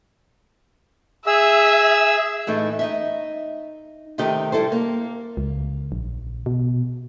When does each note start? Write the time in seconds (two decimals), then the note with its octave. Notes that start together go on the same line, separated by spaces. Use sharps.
1.27 G#4 E5 E6
2.47 A2 E3 A3 D#4
2.79 D#4 D#5 E5
4.18 C3 D#3 A3 G4 D#5
4.52 G3 E4 A4 C5
4.72 A#3
5.37 C#2
5.92 A#1
6.46 B2